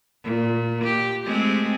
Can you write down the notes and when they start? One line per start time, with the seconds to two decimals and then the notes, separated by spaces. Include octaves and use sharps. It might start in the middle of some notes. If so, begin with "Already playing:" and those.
0.24 A#2
0.84 G4
1.26 G#3 A3 C4